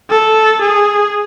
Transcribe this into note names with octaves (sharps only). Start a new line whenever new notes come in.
A4
G#4